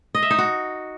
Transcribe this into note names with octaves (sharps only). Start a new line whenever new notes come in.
D#5
E5
D#4
F#4